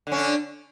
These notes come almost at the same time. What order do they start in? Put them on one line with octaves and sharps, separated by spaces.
D3 C#4 D4